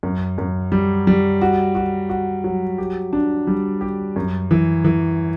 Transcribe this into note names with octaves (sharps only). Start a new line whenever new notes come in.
F#2
F#2
G3
G3
F#4
F#4
F#4
F#3
G4
D4
G3
G4
F#2
E3
E3